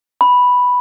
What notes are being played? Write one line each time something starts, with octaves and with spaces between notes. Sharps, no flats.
B5